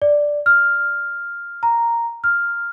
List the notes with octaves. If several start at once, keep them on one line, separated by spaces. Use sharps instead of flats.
D5
F6
A#5
F6